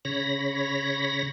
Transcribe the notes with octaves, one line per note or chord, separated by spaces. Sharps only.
C#3 C#5 B5 A#6